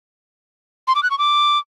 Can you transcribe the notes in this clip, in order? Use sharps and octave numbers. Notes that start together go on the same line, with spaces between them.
C6
D6
F#6
C#6
D6